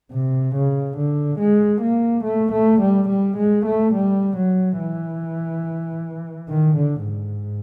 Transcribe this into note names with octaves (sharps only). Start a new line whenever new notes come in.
C3
C#3
D3
G#3
A#3
A3
A3
G3
G3
G#3
A3
G3
F#3
E3
D#3
D3
G#2